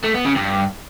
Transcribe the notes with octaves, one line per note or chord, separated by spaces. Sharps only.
A3
B3
C#3
G2